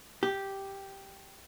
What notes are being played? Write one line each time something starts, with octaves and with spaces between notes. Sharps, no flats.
G4